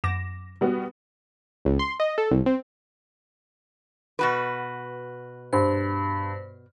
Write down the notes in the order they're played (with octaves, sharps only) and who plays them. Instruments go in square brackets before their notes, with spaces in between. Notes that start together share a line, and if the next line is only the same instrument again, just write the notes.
[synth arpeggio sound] F#2 D6 A#6 [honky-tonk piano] E7
[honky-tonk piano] G3 B3 F#4
[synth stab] C#2
C6
D#5
A4
C2
C4
[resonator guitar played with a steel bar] B2 F#4 B4
[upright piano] G2 [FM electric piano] C5